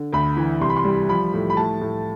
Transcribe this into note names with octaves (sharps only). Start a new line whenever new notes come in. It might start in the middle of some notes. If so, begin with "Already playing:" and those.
Already playing: D3
D2 B5
E3
C2 C6
B5
C6
G3
F3 B5
A2
B5
A2 A5
A2